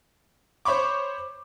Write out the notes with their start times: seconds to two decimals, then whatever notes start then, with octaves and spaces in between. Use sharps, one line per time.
0.65 C5 C#5 B5 C#6 D6